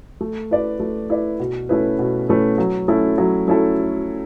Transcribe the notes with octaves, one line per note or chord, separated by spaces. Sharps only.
A3
E4 B4 D5
A3
E4 B4 D5
B2
A3 C#4 E4 B4
B2
A3 C#4 E4 B4
F#3
A3 C#4 E4 A4
F#3
A3 C#4 E4 A4